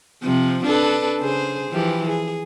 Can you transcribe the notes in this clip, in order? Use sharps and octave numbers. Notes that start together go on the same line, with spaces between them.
C3 F3
D4 A4 B4
C#3 G#4 C5
E3 F3 G4
G#4